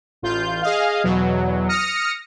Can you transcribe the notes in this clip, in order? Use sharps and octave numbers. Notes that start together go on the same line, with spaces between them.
A1 F4 G6
G#4 D#5 F5
E2 B2 F#3
D#6 F6 A#6 C#7